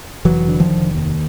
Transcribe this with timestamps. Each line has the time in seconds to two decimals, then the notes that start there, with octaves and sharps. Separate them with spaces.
0.25 F1 E3 F#3
0.48 D3
0.60 D#3 F3
0.71 F1
0.95 D#2